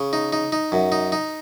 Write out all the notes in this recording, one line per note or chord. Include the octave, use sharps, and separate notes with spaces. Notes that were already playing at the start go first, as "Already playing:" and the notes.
Already playing: C#3
D#4
D#4
D#4
F#2
D#4
D#4